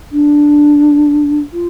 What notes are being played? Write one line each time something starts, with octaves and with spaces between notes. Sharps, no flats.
D4
F4